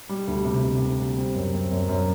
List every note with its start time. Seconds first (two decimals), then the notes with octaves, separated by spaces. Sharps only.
0.09 G3
0.27 D2
0.44 C3
0.64 C3
0.82 D2
0.99 G3
1.17 C4
1.35 F#2
1.53 C4
1.71 F#2
1.89 F#2